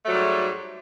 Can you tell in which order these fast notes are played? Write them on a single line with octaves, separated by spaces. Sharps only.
A3 F#3 G3 G#2